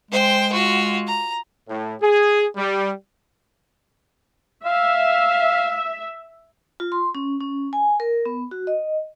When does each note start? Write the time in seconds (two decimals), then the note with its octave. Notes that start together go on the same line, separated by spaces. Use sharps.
0.11 G#3 C5 G5
0.52 F4 F#4
1.07 A#5
1.68 A2
2.01 G#4
2.56 G3
4.65 E5 F5
6.80 F4
6.92 C6
7.15 C#4
7.40 C#4
7.73 G#5
8.00 A#4
8.26 B3
8.51 F#4
8.67 D#5